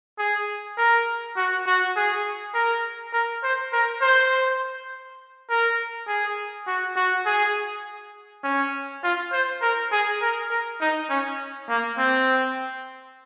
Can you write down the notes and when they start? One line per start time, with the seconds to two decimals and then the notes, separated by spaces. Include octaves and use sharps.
0.19 G#4
0.78 A#4
1.36 F#4
1.67 F#4
1.96 G#4
2.54 A#4
3.13 A#4
3.43 C5
3.73 A#4
4.01 C5
5.50 A#4
6.08 G#4
6.67 F#4
6.96 F#4
7.26 G#4
8.44 C#4
9.04 F4
9.32 C5
9.62 A#4
9.92 G#4
10.21 A#4
10.50 A#4
10.81 D#4
11.10 C#4
11.69 A#3
11.98 C4